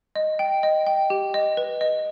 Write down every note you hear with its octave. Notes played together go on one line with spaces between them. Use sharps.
D#5
G5
D#5
G5
G4
D#5
B4
D#5